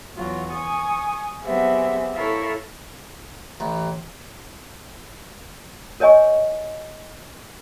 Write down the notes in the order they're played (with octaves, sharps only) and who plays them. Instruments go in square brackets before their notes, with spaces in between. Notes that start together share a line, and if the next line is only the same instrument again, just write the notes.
[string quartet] E2 F#3 F4 F#4
G#5 C#6 D#6
F#3 B3 C4 G4 G#4 E5
E4 A4 A#4 C#5 E5 F5
[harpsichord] A1
[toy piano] A#4 C#5 D#5 G#5 C#6